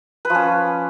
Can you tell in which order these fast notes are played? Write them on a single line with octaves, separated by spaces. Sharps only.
B4 F3 C#4